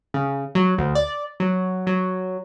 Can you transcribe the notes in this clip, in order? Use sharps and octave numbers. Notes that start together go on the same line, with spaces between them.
C#3
F#3
D2
D5
F#3
F#3